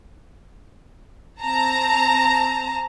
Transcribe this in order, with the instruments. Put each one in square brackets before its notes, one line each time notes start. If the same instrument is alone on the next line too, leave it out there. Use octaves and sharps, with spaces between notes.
[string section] C4 A5 A#5